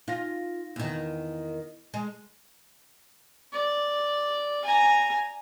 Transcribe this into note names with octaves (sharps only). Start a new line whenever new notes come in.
D#4 F4 F5 A#6
E2 D#3
G#3
D5
G#5 A#5